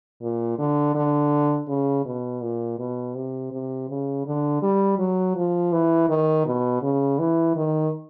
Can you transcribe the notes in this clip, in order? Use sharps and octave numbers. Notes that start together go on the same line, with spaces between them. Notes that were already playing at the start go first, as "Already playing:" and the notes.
A#2
D3
D3
C#3
B2
A#2
B2
C3
C3
C#3
D3
G3
F#3
F3
E3
D#3
B2
C#3
E3
D#3